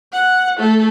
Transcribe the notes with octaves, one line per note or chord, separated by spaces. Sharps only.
F#5
A3 A4